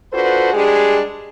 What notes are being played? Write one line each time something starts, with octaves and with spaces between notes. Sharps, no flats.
D4 F4 F#4 A4 B4 C5
G3 G#3 D4 G4 G#4